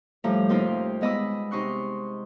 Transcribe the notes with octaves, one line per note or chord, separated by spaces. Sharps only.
A2 F3 G3 A3 A#5
D#2 C3 D#4 F4 C5 G5
G#3 B3 D#5 B5 D6 E6
C3 D#4 C6 C#6 F#6